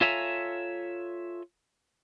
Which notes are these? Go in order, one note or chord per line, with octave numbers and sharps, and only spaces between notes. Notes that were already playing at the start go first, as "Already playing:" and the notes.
F4 A4 C#5 E5 G#5 A#5